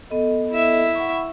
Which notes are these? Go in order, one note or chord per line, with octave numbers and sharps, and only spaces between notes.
B3 A4 D#5
E4 E5
F#5 B5 C#6